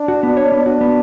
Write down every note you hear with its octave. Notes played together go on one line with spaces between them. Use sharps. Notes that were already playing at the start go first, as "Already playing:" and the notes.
Already playing: D4
F#4
B3
C#5
B3
D4 F#4
B3